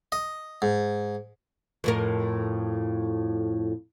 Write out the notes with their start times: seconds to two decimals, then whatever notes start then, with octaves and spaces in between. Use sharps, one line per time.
0.12 D#5
0.62 G#2
1.84 F2 A2 A#4